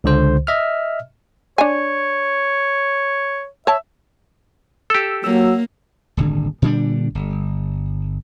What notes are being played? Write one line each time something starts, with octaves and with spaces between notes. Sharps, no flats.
C#2 D3 C5
D#5 E5 F6
D4 C#5 G#5
C#5 E5 A5
G4 A4 E6
F#3 A#3 E6
D#1 G#1 D3
A#2 D3 G3 D4
G1